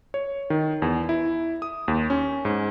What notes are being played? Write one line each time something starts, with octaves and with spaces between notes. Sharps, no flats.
C#5
D#3
E2
E4
D#6
D#2
C#4
G#2